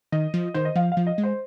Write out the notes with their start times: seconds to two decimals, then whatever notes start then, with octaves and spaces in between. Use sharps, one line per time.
0.12 D#3 D#5
0.34 F3
0.54 D#3 C5
0.65 D#5
0.76 F3 F5
0.92 F5
0.97 F3
1.07 D#5
1.18 G#3
1.23 C5